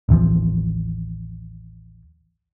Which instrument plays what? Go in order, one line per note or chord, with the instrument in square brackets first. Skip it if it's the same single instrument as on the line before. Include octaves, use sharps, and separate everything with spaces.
[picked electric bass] A1 D#2 E3 F3